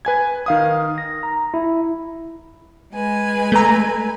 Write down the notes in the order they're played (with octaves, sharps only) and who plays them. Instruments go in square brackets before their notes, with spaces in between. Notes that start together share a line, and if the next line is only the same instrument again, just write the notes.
[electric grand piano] B4 G#5 G#6
D#3 F5 D#6
[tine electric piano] A#6
A#5
E4
[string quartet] G#3 B4 G#5
[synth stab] A3 A#5